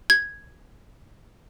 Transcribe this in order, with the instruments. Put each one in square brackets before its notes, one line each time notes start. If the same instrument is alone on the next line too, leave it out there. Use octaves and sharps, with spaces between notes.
[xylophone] G#6